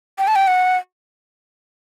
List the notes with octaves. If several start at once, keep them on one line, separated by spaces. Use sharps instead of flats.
G5
A5
G5
F#5